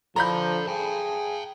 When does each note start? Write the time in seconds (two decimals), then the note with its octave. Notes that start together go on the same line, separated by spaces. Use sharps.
0.16 F3 A4 D5 A#5 B5 G6
0.67 G#4 G5 A5